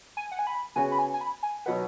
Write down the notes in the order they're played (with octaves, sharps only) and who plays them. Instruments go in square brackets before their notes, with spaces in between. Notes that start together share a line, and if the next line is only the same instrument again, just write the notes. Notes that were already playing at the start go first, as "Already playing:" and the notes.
[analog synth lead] G#5
F#5
G#5
B5
[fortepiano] C#3 B3 F#4 C#5 [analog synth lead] G#5
[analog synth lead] B5
G#5
G#5
B5
G#5
[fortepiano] B2 F#3 D#4 B4 [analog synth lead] F#5